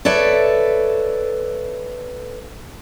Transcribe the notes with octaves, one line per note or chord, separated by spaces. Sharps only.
A4 B4 C#5 D5 E5